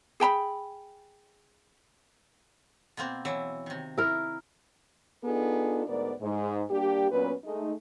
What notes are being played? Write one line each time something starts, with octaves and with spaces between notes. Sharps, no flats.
G#4 G5 A#5 B5
B2 A#3 C4
E3 F#3 E5
C3 D#3
E4 A#4
B3 D4 D#4 F4 G#4 A4
D2 G#2 B3 A#4 D5
G#2
G3 A#3 D4 G4
A#2 F#3 B3 C#4 B4
G#3 A3 D#4